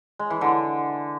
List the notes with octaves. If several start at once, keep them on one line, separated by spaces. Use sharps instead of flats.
G#3
E3
D3